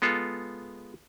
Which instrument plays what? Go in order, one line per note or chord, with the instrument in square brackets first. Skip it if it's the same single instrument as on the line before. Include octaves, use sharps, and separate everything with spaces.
[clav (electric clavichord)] G#3 B3 F4 A4